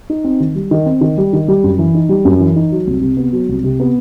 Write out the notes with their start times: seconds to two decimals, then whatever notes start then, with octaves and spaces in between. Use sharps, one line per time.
0.10 D#4
0.24 C4
0.40 D#3
0.55 G3
0.71 D#3
0.86 C4
1.01 D#3
1.18 G3
1.33 D#3
1.48 G3
1.64 F#2
1.78 E3
1.94 D#4
2.09 G3
2.25 F#2
2.40 E3
2.56 D#4
2.72 F#3
2.87 C2
3.01 C3
3.17 B3
3.32 F#3
3.49 C2
3.64 C3
3.80 B3